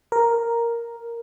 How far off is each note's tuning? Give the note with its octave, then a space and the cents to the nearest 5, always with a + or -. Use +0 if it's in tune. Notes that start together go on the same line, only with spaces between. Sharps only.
A#4 +0